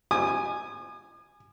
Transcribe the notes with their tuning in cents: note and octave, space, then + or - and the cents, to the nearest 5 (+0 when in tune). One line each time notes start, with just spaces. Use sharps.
G#5 +0 D#6 -45